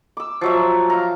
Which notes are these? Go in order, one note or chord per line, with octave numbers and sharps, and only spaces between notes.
D6 E6
F3 F#3 E5
F5 A#5